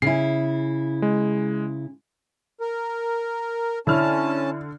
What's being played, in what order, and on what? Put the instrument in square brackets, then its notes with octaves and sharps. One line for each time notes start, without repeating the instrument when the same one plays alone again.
[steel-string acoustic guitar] C#3 E4 [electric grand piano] C7
[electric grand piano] G#3
[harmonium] A#4
[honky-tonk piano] D3 F6 [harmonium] C#4 A5 [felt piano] E4